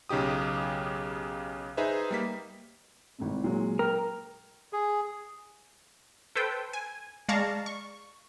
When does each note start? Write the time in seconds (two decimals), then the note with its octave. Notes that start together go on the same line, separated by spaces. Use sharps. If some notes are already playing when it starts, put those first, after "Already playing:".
0.09 B1 C#3 D#4 G4 D#6
1.77 D#4 G#4 B4 C5 E5
2.10 G3 A#3 B6
3.18 G#1 A2 C3
3.44 A#2 F#3 G#3
3.79 A#4 G5 F6
4.73 G#4
6.35 A4 B4 C5 G5
6.73 G#5
7.29 G#3 D5 F5 A5 A#5 C#6
7.66 C#6